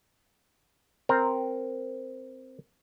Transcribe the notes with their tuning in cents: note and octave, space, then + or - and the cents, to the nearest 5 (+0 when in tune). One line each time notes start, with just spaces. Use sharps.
C4 +0 A#4 +0